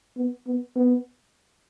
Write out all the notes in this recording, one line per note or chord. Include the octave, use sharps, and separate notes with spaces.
B3
B3
B3